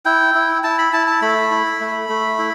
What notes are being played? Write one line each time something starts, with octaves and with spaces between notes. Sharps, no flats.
E4 G5
E4
E4 A5
B5
E4 A5
A5
A3 B5
E4
A3
A3
E4